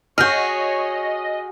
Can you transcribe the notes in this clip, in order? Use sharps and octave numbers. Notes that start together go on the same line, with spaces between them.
F#4 G#4 C#5 D#5 F6 G6